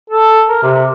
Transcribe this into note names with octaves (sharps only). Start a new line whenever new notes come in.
A4
A#4
C3